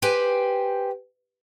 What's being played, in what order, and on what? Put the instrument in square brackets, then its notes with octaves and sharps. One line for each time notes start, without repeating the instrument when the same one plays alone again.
[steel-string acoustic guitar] G4 B4 C5 G5 G#5